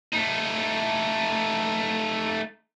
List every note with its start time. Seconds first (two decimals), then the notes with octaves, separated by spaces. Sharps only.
0.13 A3 D#4